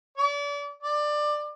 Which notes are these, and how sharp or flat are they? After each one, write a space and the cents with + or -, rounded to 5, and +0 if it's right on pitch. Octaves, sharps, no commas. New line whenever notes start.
D5 -35
D5 +20